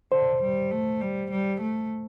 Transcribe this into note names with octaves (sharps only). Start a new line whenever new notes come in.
D3 C5
G3
A3
G3
G3
A3